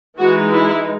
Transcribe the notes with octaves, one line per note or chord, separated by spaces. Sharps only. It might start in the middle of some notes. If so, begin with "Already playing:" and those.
E3 G#3 D#4 F#4
E4